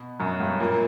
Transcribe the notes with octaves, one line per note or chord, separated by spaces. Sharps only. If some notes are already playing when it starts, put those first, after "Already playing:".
Already playing: B2
F#2 F#3
G2 G3
A#2 A#3
A#3